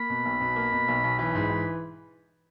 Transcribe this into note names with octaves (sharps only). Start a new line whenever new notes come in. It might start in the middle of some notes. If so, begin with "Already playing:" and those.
Already playing: A#3 B5
B2
B1
B2
A#3
B2
B1
B1
E3 B5
G#2
E3